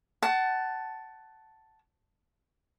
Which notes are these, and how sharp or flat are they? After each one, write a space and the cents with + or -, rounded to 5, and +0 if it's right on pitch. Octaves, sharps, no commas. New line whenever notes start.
F#5 +20 A5 +0